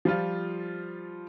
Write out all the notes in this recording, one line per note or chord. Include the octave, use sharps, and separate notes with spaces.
F3 G3 F4